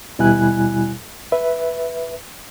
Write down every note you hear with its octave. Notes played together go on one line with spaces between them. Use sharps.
D#2 B2 G3 E4 G#5 F#6
B4 E5